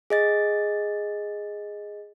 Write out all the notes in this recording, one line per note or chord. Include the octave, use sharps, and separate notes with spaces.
G#4 D#5 A6